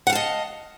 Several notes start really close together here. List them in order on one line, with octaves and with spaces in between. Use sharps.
F#5 F5 A5 D#5